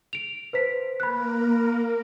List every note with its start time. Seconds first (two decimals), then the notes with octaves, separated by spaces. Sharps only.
0.13 D7 F7
0.53 B4 C5 B6
1.00 A#3 A#4 B5 F#6